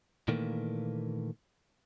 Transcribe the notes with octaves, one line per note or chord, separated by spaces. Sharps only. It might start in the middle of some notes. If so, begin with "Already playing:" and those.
A#2 D#3 E3 A3 A#3